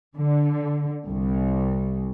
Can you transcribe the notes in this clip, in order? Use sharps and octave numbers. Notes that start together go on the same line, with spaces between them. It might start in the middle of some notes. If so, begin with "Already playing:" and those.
D3
C2